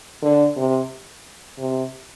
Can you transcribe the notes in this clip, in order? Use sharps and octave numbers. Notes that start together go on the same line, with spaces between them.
D3
C3
C3